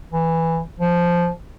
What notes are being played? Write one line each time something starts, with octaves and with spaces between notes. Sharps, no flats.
E3
F3